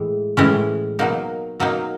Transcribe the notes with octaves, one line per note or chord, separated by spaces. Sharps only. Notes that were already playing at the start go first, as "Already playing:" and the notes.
Already playing: A2 E3 G#3
A2 E3 G#3 C#4
B2 F#3 A#3 D#4
B2 F#3 A#3 D#4